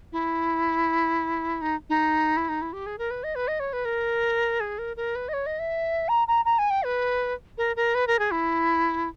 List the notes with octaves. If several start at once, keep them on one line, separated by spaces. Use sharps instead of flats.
E4
D#4
D#4
E4
D#4
E4
G4
G#4
A#4
B4
D#5
B4
D#5
C#5
B4
A#4
G#4
A#4
A#4
B4
D#5
C#5
D#5
E5
A#5
A#5
A#5
G#5
G5
B4
A#4
A#4
B4
A#4
G#4
E4